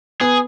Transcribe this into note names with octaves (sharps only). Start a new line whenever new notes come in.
B3 G#4